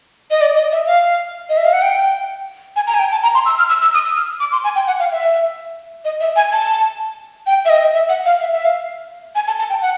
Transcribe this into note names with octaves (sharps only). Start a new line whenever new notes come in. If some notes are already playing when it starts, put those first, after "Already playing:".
D#5
D5
D#5
E5
F5
D#5
E5
F5
F#5
G5
G#5
A#5
G#5
G5
A5
A#5
C6
E6
F6
E6
E6
D#6
E6
F6
D6
C6
G#5
G5
F#5
F5
E5
D#5
E5
G#5
A5
G5
E5
D#5
E5
F#5
F5
E5
E5
F5
G#5
A5
A5
G5
F#5